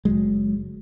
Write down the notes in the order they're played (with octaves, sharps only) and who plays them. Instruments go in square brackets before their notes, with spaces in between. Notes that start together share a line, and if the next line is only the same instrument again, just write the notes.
[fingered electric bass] F#1 C2 F#3 G#3